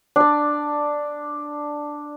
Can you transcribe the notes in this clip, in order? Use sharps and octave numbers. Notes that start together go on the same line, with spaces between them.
D4 D5